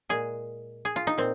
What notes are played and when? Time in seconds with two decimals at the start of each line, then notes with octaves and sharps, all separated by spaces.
0.09 A#2 G#3 G#4
0.85 G#4
0.96 F4
1.07 D#4
1.18 A#2 C4